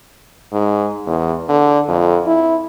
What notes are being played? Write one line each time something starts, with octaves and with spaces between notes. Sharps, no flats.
G#2
E2
D3
F2
E4